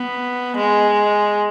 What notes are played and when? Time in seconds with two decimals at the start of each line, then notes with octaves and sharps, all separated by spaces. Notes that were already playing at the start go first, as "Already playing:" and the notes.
Already playing: B3
0.57 G#3